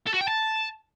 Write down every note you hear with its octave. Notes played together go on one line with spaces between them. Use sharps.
A4
F#4
G5
A5